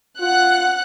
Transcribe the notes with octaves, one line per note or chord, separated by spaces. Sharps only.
F4 F#5 F#6